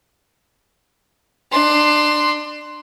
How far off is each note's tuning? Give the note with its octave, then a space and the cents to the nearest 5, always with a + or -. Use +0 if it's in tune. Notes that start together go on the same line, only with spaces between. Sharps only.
D4 +25 C6 +0